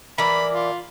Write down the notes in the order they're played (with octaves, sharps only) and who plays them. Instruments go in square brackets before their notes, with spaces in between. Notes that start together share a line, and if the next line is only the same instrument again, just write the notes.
[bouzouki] E3 A#4 D5 [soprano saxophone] B5
[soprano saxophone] F4